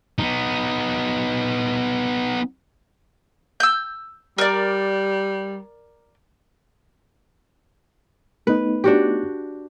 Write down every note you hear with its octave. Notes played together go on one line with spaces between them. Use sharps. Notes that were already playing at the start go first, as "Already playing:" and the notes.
B3 D#4
E6 G6
G3 A#4 D5
A3 B3 D#4 B4
D4 F#4 G4